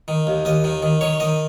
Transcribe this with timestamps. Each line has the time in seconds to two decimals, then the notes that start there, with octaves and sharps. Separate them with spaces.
0.08 D#3
0.27 D#2
0.45 D#2 D#5
0.64 D#3
0.83 D#3
1.01 D#3 C#5
1.20 D#3 D#5